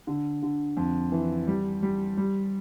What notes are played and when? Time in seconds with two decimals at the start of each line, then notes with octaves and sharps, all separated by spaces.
0.07 D3
0.42 D3
0.77 F2
1.12 E3
1.47 G3
1.83 G3
2.17 G3